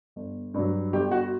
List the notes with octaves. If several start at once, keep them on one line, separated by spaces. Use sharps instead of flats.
G1
G2 F#3
G1 G4
F#4